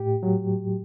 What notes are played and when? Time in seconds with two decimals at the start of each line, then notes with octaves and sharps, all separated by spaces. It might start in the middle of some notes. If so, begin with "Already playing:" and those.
Already playing: A2 G4
0.23 F#3